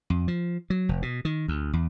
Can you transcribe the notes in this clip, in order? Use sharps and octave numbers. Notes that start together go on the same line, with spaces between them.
F2
F3
F#3
F1
B2
D#3
D2
E2